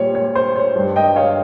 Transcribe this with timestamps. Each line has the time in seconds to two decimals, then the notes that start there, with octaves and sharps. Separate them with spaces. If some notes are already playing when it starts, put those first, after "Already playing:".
Already playing: A#2 G3 C5 C#5
0.15 C#5
0.35 C5
0.56 C#5
0.76 G2 G3
0.96 D#5 G5
1.16 C#5 F5